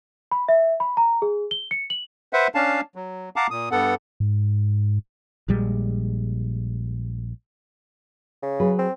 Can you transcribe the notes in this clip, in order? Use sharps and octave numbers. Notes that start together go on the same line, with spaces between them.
B5
E5
B5
A#5
G#4
G7
C#7
F#7
B4 C5 E5 F#5
C#4 D4 F5 A5
F#3
F5 F#5 A5 A#5 D6
A#2 D#6
G2 B3 A4 F#5
G#2
A#1 A#2 G3 G#3
C#3
F#3 G#4 B4
C4